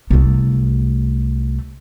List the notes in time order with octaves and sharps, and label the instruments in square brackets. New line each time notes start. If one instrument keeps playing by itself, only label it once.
[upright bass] C2 A3